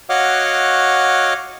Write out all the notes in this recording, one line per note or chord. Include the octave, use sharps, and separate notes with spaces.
F#4 C#5 D#5 F5 F#5 D6